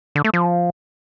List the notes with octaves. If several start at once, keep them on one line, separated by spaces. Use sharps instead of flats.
D3
A3
F3